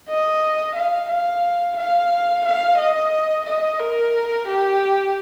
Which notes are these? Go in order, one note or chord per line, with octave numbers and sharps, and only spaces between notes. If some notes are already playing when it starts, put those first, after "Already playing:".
D#5
F5
F5
F5
F5
D#5
D#5
A#4
G4